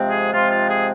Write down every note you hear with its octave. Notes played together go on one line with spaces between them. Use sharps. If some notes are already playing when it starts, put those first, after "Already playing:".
Already playing: C3 F3 G#3 C4
G#4
C3 F3 G#3 C4 F4
F4
G#4